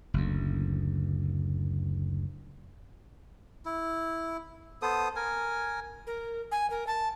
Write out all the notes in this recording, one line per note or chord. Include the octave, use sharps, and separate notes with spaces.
F#1 D2
E4
B3 A4 C5 D#6
A#4 G#5
A#4
G#5
A#4
A5